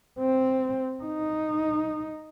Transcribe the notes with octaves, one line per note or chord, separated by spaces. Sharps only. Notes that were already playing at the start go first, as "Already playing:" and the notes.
C4
D#4